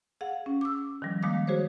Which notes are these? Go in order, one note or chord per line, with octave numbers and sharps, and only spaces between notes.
G#4 F5 F#5
C#4
D6 E6
D#3 F3 G3
D#3 G#3 A#3 F5 D6 D#6
F#4 G#4 C5 C#5